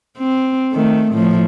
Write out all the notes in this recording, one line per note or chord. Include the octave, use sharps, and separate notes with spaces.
C4
D#3 A3
A2 F3